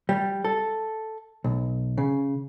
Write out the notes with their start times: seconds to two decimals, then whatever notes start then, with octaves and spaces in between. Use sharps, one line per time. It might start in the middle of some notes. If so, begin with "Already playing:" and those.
0.09 G3
0.45 A4
1.44 B1
1.98 C#3